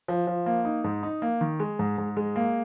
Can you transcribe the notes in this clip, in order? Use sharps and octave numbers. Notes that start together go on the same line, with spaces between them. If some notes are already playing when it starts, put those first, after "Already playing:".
F3
F3
A#3
D#4
G#2
D#4
A#3
D#3
G#3
G#2
G#2
G#3
A#3